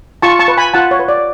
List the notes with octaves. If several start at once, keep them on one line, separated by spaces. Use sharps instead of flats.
F4 A5 C#6
A5 C#6
B4
G#5 B5
F4 F#5 A5
C#5
B4
D5